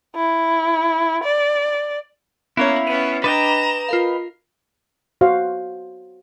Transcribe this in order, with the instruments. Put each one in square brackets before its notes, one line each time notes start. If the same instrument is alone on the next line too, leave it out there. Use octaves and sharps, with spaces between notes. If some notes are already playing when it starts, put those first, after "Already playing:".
[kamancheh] E4
D5
[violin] A#3 [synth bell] B3 C#4 C#5 [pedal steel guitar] E4 F5
[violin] B3 C#4 [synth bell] D#7
[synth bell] D4 [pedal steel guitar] B4 D#5 G5 [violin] A#5 E7
[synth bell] F4 A#4 F5
[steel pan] F#4 C5 F5